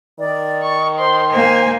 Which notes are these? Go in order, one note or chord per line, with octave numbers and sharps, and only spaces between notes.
D#3 D5
C#6
C5 C6
A#3 C5 G#5